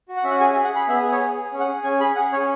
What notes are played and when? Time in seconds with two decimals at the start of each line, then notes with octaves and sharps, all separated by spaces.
0.09 F#4
0.17 F#5
0.24 C#4 E5
0.31 F#5
0.40 G#4 G#5
0.53 E5
0.56 G#4
0.64 F#5
0.72 G#4 B5
0.88 B3 E5
1.04 G#4
1.12 C#5
1.20 G#4
1.37 G#4
1.53 C#4
1.60 F#5
1.68 G#4
1.84 C#4 G#5
2.00 G#4 B5
2.16 G#4 F#5
2.32 C#4 C#5